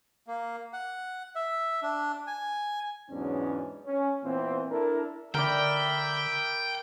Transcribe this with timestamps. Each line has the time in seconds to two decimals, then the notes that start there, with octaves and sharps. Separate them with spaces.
0.27 A#3
0.73 F#5
1.36 E5
1.82 D4
2.27 G#5
3.10 E2 G#2 F#3 B3 C#4 D4
3.86 C#4
4.24 A#2 E3 B3 C4
4.71 D4 E4 A4 A#4
5.34 D3 A#4 D5 E5 G5 B5